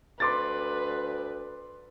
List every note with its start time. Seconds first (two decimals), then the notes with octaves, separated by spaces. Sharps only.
0.20 D2 B4 C6 D6 A6